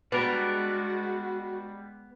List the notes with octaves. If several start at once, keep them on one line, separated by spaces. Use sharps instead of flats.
G3 G#3 B3 D4 F#4 A#4